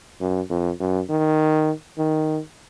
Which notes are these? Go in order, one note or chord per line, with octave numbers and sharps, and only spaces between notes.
F#2
F2
F#2
D#3
D#3